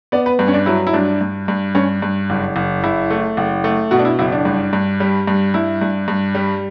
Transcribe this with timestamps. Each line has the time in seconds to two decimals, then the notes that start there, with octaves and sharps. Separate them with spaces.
0.12 B3 D5
0.26 B4
0.39 G2
0.48 C#4
0.54 D4
0.66 F#3 E4
0.87 E4
0.93 G2 D4
1.21 G2
1.48 G2
1.75 G2 C#4
2.02 G2
2.30 F#1
2.56 F#1
2.84 F#1 E4
3.10 A3
3.37 F#1
3.64 A3
3.91 B2 F#4
3.99 D4
4.05 E4
4.19 F#1 E4
4.32 D4
4.45 G2
4.73 G2
5.00 G3
5.27 G2
5.54 G2 E4
5.81 G2
6.08 G2
6.35 G3